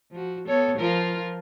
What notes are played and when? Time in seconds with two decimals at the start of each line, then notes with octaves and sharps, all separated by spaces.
0.11 F3 F#4
0.48 B3 A4 C#5
0.78 F3 F4 A#4